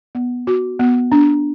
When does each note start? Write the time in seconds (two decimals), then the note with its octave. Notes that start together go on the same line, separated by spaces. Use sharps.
0.15 B3
0.47 F#4
0.79 B3
1.12 D4